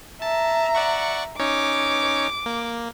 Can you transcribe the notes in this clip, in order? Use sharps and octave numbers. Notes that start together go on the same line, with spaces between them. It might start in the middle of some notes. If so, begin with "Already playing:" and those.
E5 A5 A#5
D5 F#5 C#6
C#4 D#4 C#5 D6
A#3